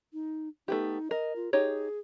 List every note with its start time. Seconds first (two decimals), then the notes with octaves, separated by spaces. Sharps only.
0.13 D#4
0.68 A3 B3 D#4 G4
1.11 A#4 D#5
1.36 F4
1.53 D#4 G4 G#4 C#5